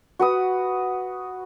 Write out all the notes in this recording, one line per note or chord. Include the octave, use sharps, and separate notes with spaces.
F#4 B4 D#6